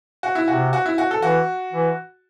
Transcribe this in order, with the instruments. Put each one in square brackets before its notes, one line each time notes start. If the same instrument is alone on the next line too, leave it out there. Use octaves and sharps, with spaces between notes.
[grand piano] F#4
E4
[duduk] C3 [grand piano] F#4
[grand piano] F#4
E4
F#4
A4
[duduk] E3 [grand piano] F#4
[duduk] E3